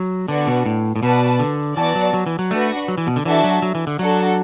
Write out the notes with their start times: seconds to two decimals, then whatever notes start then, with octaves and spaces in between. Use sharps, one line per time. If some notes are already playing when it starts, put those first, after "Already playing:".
Already playing: F#3
0.28 D3 B3 D4 F#4 D5
0.47 B2
0.66 A2
0.96 A2
1.03 B2 F#4 B4 D5 A5
1.39 D3
1.77 E3 B3 F#4 D5 A5
1.95 F#3
2.14 F#3
2.26 E3
2.39 F#3
2.51 A3 D4 F#4 B4
2.88 F#3
2.98 E3
3.07 B2
3.16 D3
3.25 E3 D4 F#4 A4 E5 A5
3.44 F#3
3.62 F#3
3.75 E3
3.87 D3
3.99 F#3 D4 F#4 A4